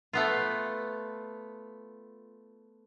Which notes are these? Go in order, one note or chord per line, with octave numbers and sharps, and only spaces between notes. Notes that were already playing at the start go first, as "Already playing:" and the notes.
A3 B3 F4